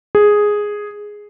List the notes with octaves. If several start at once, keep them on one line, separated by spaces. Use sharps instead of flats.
G#4